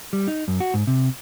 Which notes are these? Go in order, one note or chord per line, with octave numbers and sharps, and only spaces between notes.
G3
D#4
F#2
F#4
G#2
C3